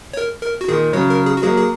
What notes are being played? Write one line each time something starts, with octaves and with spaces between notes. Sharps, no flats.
C#5
A#4
A#4
F#4
A#2 D#3 G#4
C#3 F#3 C#5
A#4
G#4
F#4
F#3 A#3 G#4
G#4